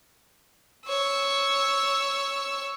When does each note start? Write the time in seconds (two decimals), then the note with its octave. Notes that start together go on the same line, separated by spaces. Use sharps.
0.87 C#5 E6